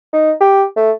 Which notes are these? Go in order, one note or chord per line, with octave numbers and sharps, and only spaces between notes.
D#4
G4
A3